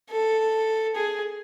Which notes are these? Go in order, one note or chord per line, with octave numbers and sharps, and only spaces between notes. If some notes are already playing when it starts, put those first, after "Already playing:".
A4
G#4